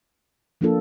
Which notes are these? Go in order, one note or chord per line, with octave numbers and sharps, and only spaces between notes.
F3 A#3 D4 F4 A4